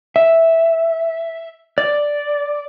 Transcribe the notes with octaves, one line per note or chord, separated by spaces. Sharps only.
E5
D5